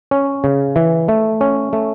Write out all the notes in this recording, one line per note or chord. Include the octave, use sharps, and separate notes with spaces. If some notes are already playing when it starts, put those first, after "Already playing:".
C#4
C#3
E3
A3
C#4
A3